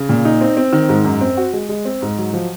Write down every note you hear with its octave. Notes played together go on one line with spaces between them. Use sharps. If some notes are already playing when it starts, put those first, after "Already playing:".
Already playing: C#3
A#2
D#4
C4
C4
D#3
G#2
F#2
C4
F#4
G#3
G#3
C4
G#2
F#3
F3